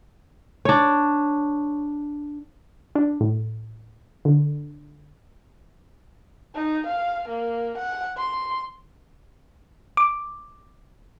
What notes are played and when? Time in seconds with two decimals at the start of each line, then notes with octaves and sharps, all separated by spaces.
0.65 D4 C#5
2.95 D4
3.21 A2
4.25 D3
6.55 D#4
6.87 F5
7.28 A#3
7.78 F#5
8.17 C6
9.97 D6